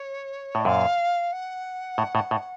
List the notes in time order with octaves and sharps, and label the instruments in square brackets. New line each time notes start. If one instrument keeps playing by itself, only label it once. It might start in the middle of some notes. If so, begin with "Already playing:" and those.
Already playing: [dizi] C#5
[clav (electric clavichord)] A2
[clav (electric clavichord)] F#2 A#2 [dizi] F5
[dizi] F#5
[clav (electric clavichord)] A2
A2
A2